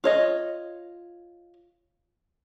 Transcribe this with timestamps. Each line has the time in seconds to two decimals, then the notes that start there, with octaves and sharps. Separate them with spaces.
0.04 F4 C#5 D#5